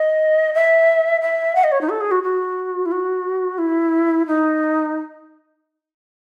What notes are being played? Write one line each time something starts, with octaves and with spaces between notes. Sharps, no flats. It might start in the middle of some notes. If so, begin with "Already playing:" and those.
Already playing: D#5
E5
E5
F#5
D#5
C#5
D#4
A4
G#4
F#4
F#4
E4
F#4
E4
D#4